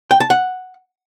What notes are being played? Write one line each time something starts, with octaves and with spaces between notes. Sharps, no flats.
G5
A5
F#5